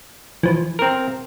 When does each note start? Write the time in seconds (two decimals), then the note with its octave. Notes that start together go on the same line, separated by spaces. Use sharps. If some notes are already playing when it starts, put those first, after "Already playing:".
0.43 E3 F3
0.79 C4 A#4